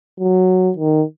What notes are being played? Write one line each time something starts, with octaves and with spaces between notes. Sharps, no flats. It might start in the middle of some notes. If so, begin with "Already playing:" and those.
F#3
D#3